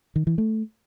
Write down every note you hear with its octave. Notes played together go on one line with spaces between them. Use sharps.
D#3
E3
A3